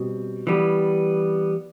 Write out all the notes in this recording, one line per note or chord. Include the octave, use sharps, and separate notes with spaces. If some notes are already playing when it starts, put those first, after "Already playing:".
Already playing: B2 G3 C4
E3 G3 B3